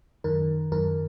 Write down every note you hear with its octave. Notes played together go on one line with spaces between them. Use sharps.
F#2 D#3 A#4
F#2 D#3 A#4